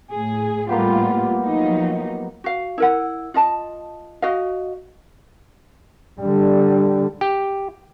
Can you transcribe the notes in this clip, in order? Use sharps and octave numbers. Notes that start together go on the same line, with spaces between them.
A2 G#4
A2 G3 A#3 B3 F4 G4
F3 F#3 D#4
F#4 F5
E4 A#4 F#5
F4 D#5 A5
F#4 D#5 F5
D3 G3
G4